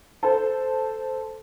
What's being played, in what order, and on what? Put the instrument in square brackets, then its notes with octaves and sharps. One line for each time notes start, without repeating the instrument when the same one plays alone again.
[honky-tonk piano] A4 C5